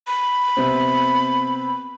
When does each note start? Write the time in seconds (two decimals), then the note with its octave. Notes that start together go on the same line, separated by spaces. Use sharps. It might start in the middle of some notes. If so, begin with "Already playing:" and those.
0.07 B5
0.57 C3 B3 C4